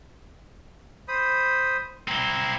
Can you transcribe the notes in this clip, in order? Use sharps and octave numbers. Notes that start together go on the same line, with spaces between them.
C5 B5 D#6
C4 E4 A#5